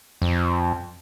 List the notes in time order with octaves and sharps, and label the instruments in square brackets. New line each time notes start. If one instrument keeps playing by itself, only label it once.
[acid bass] F2